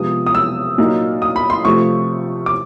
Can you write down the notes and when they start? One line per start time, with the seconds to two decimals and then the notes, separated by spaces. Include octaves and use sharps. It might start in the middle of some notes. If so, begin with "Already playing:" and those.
Already playing: C3 F3 G#3 B3 D#6
0.26 D#6
0.35 E6
0.78 A#2 F#3 A#3 D#4
1.22 D#6
1.36 B5
1.50 C6
1.65 C3 F3 A3 C4 F4 C#6
2.46 D6